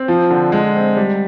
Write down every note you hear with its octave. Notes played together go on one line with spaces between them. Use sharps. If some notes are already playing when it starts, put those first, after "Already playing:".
Already playing: C4
F3
D3
G#3
C4
G3